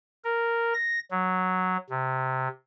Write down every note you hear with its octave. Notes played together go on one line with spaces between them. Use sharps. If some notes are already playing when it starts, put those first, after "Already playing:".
A#4
A#6
F#3
C3